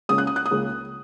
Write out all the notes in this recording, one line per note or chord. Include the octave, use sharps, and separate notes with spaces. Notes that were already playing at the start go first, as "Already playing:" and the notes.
C#2 C#3 A#3 C#4 D#6
F#6
D#6
F#6
D#6
C#2 C#3 A#3 C#4